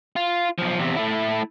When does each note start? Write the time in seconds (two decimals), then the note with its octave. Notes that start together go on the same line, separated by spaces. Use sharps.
0.16 F4
0.59 B1 F3
0.79 E2 C3
0.96 A3 E4